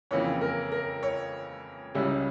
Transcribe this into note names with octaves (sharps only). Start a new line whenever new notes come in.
F2 C#3 E3 A#3 C#4 C#5
A#4
A#4
C#5
C#2 C#3 G3 C#4 E4